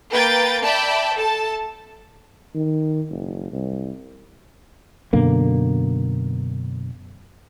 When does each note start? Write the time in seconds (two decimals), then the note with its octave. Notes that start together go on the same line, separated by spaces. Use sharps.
0.11 A#3 B4 G5 A6
0.63 D5 E5 G5 A5 B5
1.17 A4 A5
2.55 D#3
3.10 F#1
3.52 C2
5.13 F#2 B2 D3 A#3